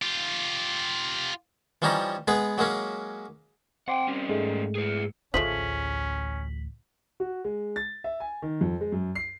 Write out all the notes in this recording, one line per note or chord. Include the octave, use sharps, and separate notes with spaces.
F4 G4
E3 F3 G3 C#4 D#4 A#5
G#3 B3 G#4 B4
F#3 G#3 A#3 C#4
C4 F#5 G5 C6 D6
G3 C#4
G#2 G#3 A3
G#4 B4
A1 D2 F3 G#3 A3 C#4 B6 F#7
F#4
G#3
A6
E5
G#5
D#3
F2
G#3
F#2
C7